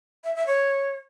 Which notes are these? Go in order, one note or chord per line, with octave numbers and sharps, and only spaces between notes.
E5
E5
C#5